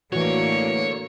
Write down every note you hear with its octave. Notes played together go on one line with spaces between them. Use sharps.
A2 D3 E3 A#3 F#4 C#5